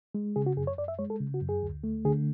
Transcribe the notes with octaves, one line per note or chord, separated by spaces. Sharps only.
G#3
C#3 G#4
F#4
F#2 G#4
C#5
F#2 D5
E5
G#3 C#5
A4
C#3
F#4
F#2
G#4
D2
A3
D3 G#4